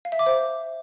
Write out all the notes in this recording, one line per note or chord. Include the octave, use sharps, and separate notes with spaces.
F5
E5
D6
C5